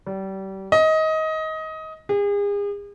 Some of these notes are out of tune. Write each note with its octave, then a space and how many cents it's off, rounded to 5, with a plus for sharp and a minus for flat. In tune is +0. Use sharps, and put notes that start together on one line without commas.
G3 -30
D#5 +20
G#4 -40